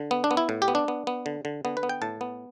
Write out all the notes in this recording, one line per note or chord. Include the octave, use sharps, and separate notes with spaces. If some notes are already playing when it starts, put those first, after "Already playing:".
Already playing: D3
B3
D4
B3
E4
A2
G4
B3
D4
B3
B3
D3
D3
D3 B3
B4
B3
G5
A2 A5
B3